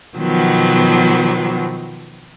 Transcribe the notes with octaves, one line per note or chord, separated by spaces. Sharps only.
B2 D#3 F3 F#3 B3